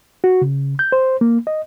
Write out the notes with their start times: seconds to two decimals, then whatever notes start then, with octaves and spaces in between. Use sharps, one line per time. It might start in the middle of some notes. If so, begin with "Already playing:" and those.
0.24 F#4
0.42 C#3
0.79 G6
0.92 C5
1.21 A#3
1.47 D#5